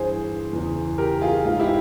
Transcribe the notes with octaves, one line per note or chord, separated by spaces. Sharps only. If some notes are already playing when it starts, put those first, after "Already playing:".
Already playing: G2 E3 G#4 C5
E2 C#3 E3
G4 A#4
F4 G#4
G#2 E3 F4
E4 G4